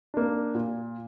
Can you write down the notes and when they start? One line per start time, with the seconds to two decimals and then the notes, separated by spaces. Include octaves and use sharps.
0.14 A#3 D4
0.55 A#2